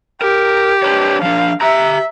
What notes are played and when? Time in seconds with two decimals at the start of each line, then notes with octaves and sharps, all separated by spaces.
0.22 G4 A#4
0.82 D4 B4 C#5
1.22 F3 D4 F5
1.61 G4 E5 A#5